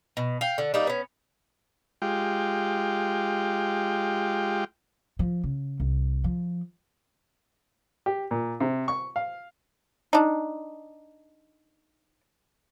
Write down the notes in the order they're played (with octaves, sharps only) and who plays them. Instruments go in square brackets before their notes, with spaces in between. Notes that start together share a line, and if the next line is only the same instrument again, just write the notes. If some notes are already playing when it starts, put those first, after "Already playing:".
[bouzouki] B2
F5 G5
D3
G3 A#3 D#4
B3 C#4
[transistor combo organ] G#3 F4 G4 G5
[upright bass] F3
C#3
C2
F3
[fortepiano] G4
A#2
C3
C#6
F5
[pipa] D4 D#4